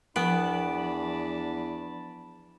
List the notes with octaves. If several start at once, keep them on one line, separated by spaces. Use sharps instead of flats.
E2 F3 B3 D4 A5 B5 D7 F#7